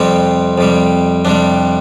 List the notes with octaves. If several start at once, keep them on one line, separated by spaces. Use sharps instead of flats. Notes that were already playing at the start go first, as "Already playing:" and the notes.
Already playing: F2 C3 G3 C4
F2 C3 G3
F2 C3 G3 D4